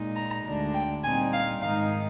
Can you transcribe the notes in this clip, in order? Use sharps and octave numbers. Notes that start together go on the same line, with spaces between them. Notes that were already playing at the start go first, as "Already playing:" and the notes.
Already playing: A#2 G#3 D#4
A#5
D2 D3 G#3 D4
G5
A#2 G3 C4 D#4 G#5
F5
G#2 D#3 G#3 D#4 F5